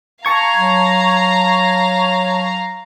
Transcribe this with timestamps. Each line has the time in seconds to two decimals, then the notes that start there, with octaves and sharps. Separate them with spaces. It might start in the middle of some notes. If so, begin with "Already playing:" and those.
0.25 F5 A5 A#5 C#6 G#6
0.56 F#3